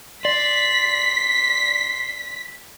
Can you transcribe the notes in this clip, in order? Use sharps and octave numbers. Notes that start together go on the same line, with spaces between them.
D5 C6 B6